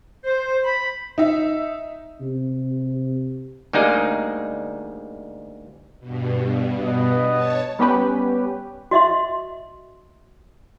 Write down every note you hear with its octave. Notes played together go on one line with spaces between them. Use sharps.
C5
B5
D#4 E5
C3
D2 G3 G#3 A#3 D#4 G#4
G2 B2
B3 D#5
C#5 A5
G3 B3 C#4 G4 B4
F#4 D#5 E5 C6